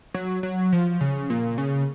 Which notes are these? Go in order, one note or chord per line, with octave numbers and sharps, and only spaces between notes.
F#3
F#3
F3
C#3
A#2
C#3